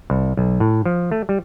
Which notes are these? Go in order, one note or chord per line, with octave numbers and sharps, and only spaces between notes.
C2
B1
A2
F3
A3
G3